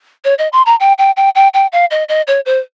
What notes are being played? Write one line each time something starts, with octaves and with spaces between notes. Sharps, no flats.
C#5
D#5
C6
A#5
G5
G5
G5
G5
G5
F5
D#5
D#5
C#5
C5